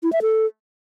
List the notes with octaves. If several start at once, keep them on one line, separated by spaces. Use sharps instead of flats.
E4
E5
A4